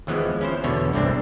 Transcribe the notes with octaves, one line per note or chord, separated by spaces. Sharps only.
D#2 E3 F3 G#3 B3
C#4 E4 C5
E2 B2 D3 C#5
G1 C2 D3 C4 D4